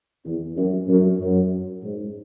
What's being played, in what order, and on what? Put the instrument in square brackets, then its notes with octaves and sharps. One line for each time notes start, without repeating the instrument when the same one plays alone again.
[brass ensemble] E2
F#2
F#2
F#2
G#2